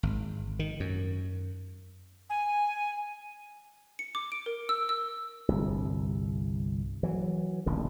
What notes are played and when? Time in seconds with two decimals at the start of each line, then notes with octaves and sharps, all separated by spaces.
0.03 G#1
0.59 D#3
0.80 F#2
2.30 G#5
3.99 C#7
4.15 D6
4.32 D7
4.46 A#4
4.69 E6
4.89 E6
5.48 G1 C2
7.03 E3 F#3
7.66 D#1 A1 D3